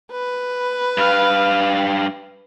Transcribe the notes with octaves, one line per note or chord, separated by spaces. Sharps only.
B4
G2 F5